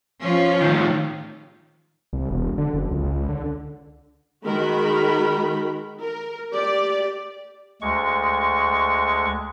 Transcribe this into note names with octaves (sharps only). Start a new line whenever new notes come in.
F3 C#4 F4
A2 D#3
C2
E1
D3
F#1
C#2
D3
D#3 G#3 F#4 A#4 B5
A#4
G4 D5
D2 G#3 C#6